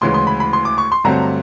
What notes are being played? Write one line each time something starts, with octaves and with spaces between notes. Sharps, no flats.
D2 C#3 E3 G#3 C6
C6
B5
B5
C6
D6
C#6
C6
G2 D3 F#3 A3 C4 A#5